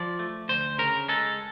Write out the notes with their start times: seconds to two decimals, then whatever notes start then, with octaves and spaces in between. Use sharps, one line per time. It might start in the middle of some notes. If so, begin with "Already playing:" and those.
Already playing: F3 D5
0.19 A3
0.49 D2 C5
0.78 C#3 A#4
1.08 G#3 A4